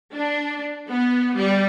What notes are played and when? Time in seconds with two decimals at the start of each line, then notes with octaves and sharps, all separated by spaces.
0.13 D4
0.88 B3
1.37 G3